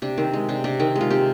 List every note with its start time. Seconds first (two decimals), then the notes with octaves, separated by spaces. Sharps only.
0.02 C3 D4
0.18 D#3 C4
0.33 G#3
0.49 C3 D4
0.64 C3 D4
0.79 D#3 C4
0.96 G#3
1.01 F4
1.10 C3 G4